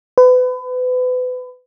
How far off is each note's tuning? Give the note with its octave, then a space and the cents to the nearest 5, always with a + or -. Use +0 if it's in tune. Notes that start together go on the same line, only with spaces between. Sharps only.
B4 +30